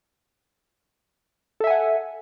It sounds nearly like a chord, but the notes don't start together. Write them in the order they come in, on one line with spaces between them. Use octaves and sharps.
A4 E5 G#5 F#5